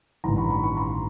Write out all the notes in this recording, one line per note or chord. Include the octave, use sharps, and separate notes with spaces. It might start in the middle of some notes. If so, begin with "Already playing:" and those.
A1 G2 D#3 A#5 C6
B5 C#6
B5 C#6
B5 C#6
A#5 C6